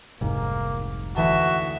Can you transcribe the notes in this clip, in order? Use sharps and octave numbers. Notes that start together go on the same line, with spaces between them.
F1 C2 G#2 A#3
D2 E3 F#4 E5 A5